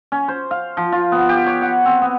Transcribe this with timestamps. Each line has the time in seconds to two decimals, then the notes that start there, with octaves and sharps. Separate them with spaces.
0.12 C#4
0.28 C5
0.51 F5
0.77 F3
0.92 F4
1.12 B3
1.29 G4
1.46 C#5
1.62 F#5
1.85 C4
2.02 B3